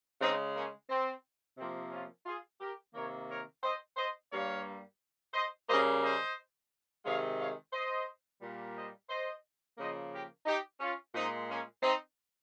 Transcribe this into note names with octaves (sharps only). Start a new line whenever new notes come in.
C#3 G#3 C4 D#4
A#3 C#4
C4
C3 F3 A#3 C4
C#4 F4
F4 G#4
G4 A#4
C3 D#3 A#3 A#4 C#5
A#4 C#5
C5 D#5
C5 D#5
G2 G3 A#3 C#5 F5
C5 D#5
C#3 G3 A#3 C5 D#5
C5 D#5
C3 D#3 G#3 C#5 F5
C#5 F5
C5 D#5
A#2 G3 A#3
C5 D#5
C5 D#5
C#3 F3 A#3 C5 D#5
G4 A#4
D#4 G4
C#4 F4
A#2 G#3 C4 D#4
A#3 C#4
C4 D#4